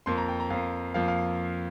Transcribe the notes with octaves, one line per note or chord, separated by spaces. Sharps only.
F2 F3 A#3 C6
A#5
G5
A#5
F2 F3 A#3 F5
F2 F3 A#3 F5
F5